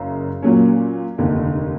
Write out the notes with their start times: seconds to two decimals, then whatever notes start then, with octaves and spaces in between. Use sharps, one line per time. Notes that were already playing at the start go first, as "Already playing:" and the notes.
Already playing: F#1 F#2 C#3
0.43 A#2 F#3 A#3 C#4
1.18 F1 D#2 D3